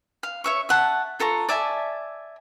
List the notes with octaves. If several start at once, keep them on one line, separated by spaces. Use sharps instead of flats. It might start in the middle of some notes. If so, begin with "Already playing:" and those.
F5
C#5 E5 C#6
E5 F#5 A5
F4 A4 A#5 C#6
D5 E5 G#5 A5